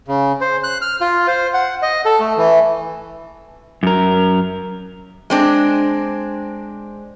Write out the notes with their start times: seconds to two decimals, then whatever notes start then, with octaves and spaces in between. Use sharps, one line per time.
0.08 C#3
0.41 C5
0.64 F#6
0.82 F6
1.01 F4
1.28 C5
1.54 F#5
1.82 D#5
2.05 A4
2.20 A3
2.37 E3
3.83 F#2 A#4
5.30 G#3 C4 D4